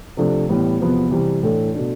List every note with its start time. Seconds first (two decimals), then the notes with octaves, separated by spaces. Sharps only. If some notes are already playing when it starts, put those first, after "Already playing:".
0.17 C3 F3 A3 D4
0.49 A2 E3 G3 B3
0.80 E2 C3 F3 B3
1.11 C3 E3 G3
1.43 A2 E3 A3 D4 A4
1.74 B2 A3 D4